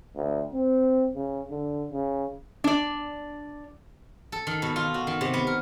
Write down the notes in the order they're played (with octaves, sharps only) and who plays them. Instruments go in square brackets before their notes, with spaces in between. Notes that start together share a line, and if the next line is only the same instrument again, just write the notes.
[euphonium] D2
C4
C#3
D3
C#3
[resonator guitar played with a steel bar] D4 D5
[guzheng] A4
D#3
B2
F4
F#4
D#3
C3
B3
A#4